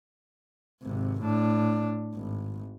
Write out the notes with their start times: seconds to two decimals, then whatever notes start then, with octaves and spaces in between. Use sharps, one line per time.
0.83 G#1 C3
1.21 A2 D4
2.15 G#1